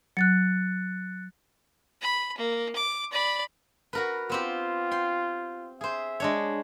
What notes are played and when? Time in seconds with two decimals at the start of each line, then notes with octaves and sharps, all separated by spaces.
0.17 F#3 F#6 A6 C#7
2.01 B5
2.37 A#3
2.76 D6
3.12 D5 B5
3.93 F#4 A#4 B4
4.30 B3 C4 F4 G4
4.91 G5 C6
5.81 G#4 C5 E5
6.20 G#3 D4 C#5